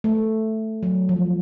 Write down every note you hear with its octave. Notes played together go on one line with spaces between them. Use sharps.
A3
F#3
F3